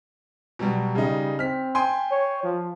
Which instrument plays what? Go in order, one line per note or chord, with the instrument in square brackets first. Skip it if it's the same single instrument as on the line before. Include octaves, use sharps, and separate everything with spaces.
[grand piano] B2 F#3 G3
[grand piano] C#3 D#4 [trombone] G3
[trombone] C4 [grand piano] F6 B6
[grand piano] G5 G#5 C6
[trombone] C#5
F3